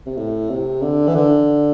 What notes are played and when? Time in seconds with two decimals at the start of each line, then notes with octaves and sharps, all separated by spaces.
0.06 C3
0.17 A2
0.50 C3
0.82 D3
1.07 E3
1.15 D3